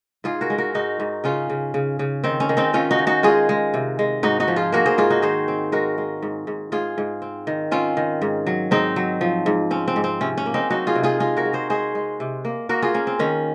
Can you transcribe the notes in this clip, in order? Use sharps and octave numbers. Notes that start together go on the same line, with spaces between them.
G#2 F4 G#4
F#4 A#4
G#3
F#4 A#4
G#2 D#4 F#4
G#2
C#3 C#4 F4
C#3
C#3
C#3
D#3 C4
C#4
D#3
C4 D#4
D#3 C#4 F4
D#4 F#4
D#3
D#4 F#4
G#3 F4 G#4
G#3
C3
G#3
G#2 D#4 F#4
D#4 F#4
F3
F4 G#4
A#3 F#4 A#4
G#4 C5
G#2 F4 G#4
D#4 F#4
D#3 G#4 C5
C4
G#3 F#4 A#4
G#3
G#2
G#2
G#2 F4 G#4
G#2
C4
D#3
C4 C#4 F4
D#3
G#2
F#3
G#2 C4 D#4
F#3
F3
G#2
C4 C#4
C4
G#2
C4
C3 C#4
C#4
A#3
C4 D#4
F#3 D#4 F#4
F4 G#4
C3
F4 G#4
G#3 F4 G#4
F#4 A#4
G#3
G#4 C5
G#3 G#4 C5
G#3
C3
A#3
A#3 F#4 A#4
F4 G#4
A#3 C#4
C4
D#3 C#4